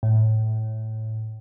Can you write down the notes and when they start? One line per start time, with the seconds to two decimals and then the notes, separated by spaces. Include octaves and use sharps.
0.03 A2